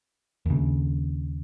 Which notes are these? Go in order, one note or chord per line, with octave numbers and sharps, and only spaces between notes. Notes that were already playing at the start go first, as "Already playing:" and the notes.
D#2 C#3